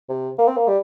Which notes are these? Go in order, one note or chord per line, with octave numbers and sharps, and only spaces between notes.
C3
A#3
C4
A#3
G3